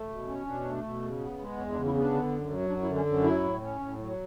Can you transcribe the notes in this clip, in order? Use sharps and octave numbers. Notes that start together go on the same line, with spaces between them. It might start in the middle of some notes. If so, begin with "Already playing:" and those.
Already playing: A3
B2
C#4
B2 D4
A3
B2
C#3
B3
G#3
E2 C#4
D4
C#3
E4
B3 D4
D3
F#2
F#3
F#2 D4
E4
D3
C#4
F#2
F#3 E4
A2
C#4
A2
F#3